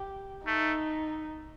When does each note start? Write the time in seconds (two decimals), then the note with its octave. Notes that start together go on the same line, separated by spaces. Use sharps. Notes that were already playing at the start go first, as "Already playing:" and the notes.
Already playing: G4
0.47 A3 D#4